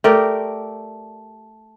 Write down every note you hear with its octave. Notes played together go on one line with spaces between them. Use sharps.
A3 G4 A#4 D5